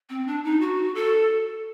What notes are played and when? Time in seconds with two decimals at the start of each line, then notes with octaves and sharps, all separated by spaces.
0.10 C4
0.27 D4
0.44 D#4
0.61 F#4
0.95 A4